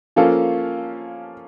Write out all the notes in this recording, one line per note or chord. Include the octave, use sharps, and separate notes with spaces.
F3 A#3 C#4 F4 A4